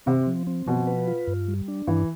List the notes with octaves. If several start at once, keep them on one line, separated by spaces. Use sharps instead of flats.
C3 C4
F3
C4
B2 F3
B4
F4
G2
G3
D4
G2 E3